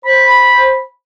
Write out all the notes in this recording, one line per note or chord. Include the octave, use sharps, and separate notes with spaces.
C5 B5